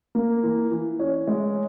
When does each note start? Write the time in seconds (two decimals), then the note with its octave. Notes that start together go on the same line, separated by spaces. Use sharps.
0.15 A#3
0.43 E3
0.71 E3
0.99 C#4
1.27 G#3